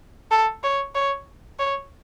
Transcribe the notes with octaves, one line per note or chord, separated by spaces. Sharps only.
A4
C#5
C#5
C#5